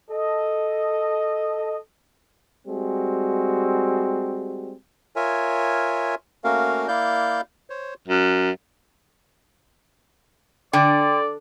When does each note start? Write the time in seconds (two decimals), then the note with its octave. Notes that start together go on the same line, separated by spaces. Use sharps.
0.11 A4 D#5
2.67 G3 G#3 C4 F#4
5.16 F4 A#4 C#5 E5 G#5
6.44 A3 A#3 C#4 F#4 A#4 F5
6.88 A#3 E4 D5 F5 G6
7.70 C5 C#5
8.08 F#2
10.73 D3 D5 G5